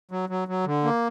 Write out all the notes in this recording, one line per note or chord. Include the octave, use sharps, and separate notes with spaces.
F#3
F#3
F#3
D3
A#3